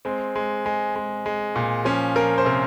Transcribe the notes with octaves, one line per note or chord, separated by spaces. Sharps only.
G#3 C4
G#3
G#3
G#3
G#3
A#2
F3 C#4
F3 A#4
C5
C3 A#4